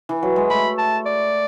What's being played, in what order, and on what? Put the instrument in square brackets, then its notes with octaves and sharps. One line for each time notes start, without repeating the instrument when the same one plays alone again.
[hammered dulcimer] E3
F#3
G#3
[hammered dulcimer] A3 [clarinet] B5
[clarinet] A5
D5